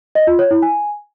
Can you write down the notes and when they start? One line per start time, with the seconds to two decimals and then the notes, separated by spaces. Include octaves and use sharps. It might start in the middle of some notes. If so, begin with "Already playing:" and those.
0.15 D#5
0.27 F4
0.39 C#5
0.51 E4
0.62 G#5